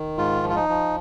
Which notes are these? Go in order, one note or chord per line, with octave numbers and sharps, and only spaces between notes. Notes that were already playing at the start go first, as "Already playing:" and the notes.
Already playing: D#3
G#2 F4
F3
F4
D#4
F3